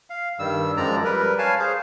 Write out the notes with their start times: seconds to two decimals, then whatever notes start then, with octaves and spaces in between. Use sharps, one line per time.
0.10 F5
0.39 G2 D#3 G3 E6
0.77 F#2 F3 G#3 D5 A#5
1.05 G3 A#4 B4
1.39 C#5 F5 G#5 A5
1.59 G#4 C5 F5